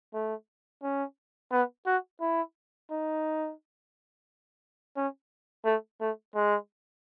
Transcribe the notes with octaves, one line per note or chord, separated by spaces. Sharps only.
A3
C#4
B3
F#4
E4
D#4
C#4
A3
A3
G#3